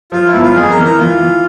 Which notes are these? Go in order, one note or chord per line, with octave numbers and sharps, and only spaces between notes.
F3 F4
E4
G1
F4
F2 G#4
A#4
E3
A#4
E3 F4
E3